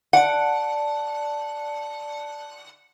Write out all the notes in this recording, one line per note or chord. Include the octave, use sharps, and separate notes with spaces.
D5 F#5 A5